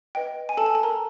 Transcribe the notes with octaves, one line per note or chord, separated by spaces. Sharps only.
B4 D#5 G5
G#5
A4 A5
G#5
A4 A5
A#4 A#5